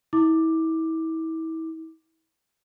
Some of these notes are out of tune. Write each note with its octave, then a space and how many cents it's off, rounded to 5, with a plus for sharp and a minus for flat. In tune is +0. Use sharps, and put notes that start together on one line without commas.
E4 -35 D6 +10